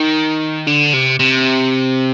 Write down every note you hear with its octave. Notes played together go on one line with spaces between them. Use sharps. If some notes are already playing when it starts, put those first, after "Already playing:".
Already playing: D#3
D3
C3
C3